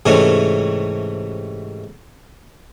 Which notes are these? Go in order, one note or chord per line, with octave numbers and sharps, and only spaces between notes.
G#2 C3 E3 A3 C#4